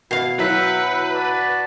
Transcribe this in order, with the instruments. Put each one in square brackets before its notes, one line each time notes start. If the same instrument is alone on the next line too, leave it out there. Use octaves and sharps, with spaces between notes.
[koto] B2 F5 [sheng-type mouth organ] E4 [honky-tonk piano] C7
[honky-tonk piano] F#3 E4 B6 [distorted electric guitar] B4 [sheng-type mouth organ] E5 F#5 G5
[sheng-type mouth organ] F#4 D5 A5